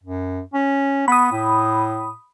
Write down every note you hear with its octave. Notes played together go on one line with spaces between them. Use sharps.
F#2
C#4
B3 B5 D#6
A2